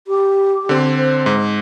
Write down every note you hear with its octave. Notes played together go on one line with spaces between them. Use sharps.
G4
D3 C4
C5
G#2